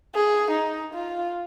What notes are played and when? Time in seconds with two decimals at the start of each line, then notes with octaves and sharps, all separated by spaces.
0.15 G#4
0.51 D#4
0.94 F4